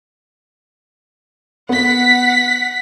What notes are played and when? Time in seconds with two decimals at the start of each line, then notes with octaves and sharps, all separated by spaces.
1.69 B3 F#5 B6